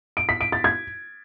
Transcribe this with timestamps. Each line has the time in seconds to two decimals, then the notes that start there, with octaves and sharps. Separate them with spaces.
0.17 D7
0.29 B6
0.41 D7
0.52 A6
0.64 G#6